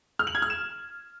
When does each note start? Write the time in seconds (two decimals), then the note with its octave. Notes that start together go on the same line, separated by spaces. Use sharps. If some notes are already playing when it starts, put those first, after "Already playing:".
0.19 F6
0.27 F#7
0.35 G#6
0.42 F6
0.50 E7